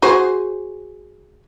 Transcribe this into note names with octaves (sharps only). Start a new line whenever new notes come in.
F#4 G#4 C5